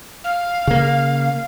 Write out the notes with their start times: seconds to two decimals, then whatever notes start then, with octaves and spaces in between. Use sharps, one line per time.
0.24 F5
0.67 C#3 A#3